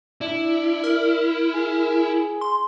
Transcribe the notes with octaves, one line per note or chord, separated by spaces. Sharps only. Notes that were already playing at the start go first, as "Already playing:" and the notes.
D4 E4
A#4
G#4
C6